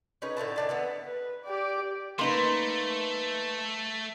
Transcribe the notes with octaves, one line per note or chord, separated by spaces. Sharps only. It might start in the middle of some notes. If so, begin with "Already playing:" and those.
C#4 D#4 G#4 B4
A2 D3 A3 A5
D#3 D4 A5
D3 E3 B3
B4
G4 D5
A3 A#3 D#4 B4 C6